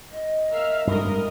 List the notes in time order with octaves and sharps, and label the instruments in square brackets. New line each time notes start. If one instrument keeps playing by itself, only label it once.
[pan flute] D#5
[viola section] A#4 E5 F5
[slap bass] G2 G3 [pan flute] G#3 [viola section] A#4 D#5